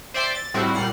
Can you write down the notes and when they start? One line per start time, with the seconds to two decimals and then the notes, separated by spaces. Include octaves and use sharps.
0.14 C5 D5 E5 G5 C6 D6
0.35 A6
0.54 A2 G3 C4 E4 F#4
0.74 A#2 G3 F#5 F6 C7